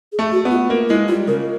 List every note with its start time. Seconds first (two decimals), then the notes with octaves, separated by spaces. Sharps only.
0.12 G#4
0.19 A3
0.32 F#4
0.45 B3
0.51 F4
0.70 A#3
0.89 G#3 E4
1.08 G3 F4
1.28 C#3 A#4